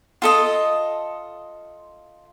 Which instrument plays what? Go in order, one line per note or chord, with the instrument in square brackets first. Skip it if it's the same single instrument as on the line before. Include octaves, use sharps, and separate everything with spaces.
[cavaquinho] F4 A4 D#5